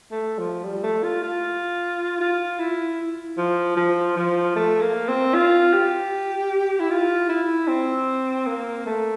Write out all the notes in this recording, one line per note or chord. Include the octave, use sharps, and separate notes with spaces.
A3
F3
G3
A3
F4
F4
F4
E4
F3
F3
F3
A3
A#3
C4
F4
G4
E4
F4
E4
C4
A#3
A3